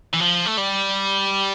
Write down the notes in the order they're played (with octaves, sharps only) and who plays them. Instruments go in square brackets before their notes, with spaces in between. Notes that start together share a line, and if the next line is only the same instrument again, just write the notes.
[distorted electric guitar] E3
F3
A3
G3